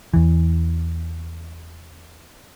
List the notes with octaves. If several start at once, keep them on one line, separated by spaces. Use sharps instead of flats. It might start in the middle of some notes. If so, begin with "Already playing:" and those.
E2 E3